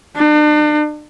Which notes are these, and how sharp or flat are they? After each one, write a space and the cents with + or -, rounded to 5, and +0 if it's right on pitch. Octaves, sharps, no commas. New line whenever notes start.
D4 +40